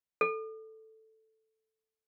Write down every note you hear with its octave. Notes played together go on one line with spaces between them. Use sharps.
A4